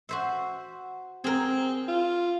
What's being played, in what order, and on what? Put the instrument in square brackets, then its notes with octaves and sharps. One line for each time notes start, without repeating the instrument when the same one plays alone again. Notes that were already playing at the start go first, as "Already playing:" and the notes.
[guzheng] F#4 C5 E5
[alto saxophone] C4 [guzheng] G#4 A#4
[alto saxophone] F4